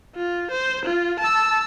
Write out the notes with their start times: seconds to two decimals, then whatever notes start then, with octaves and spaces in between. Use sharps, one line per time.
0.16 F4
0.51 C5
0.85 F4
1.19 A5 E6